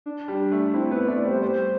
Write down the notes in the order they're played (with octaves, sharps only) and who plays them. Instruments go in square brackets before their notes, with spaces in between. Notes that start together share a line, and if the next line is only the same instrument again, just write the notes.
[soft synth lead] D4
[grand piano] G3
A3
[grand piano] C4 [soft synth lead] E4
[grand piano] B3 [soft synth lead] B4
[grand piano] A3 [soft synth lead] D5
[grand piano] G3 [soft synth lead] C5
[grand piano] G3 [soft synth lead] C5